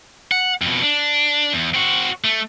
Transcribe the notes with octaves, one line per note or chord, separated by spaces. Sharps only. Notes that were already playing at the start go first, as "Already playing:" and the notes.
F#5
F2 B2
D4
E2
C4 F#4
A3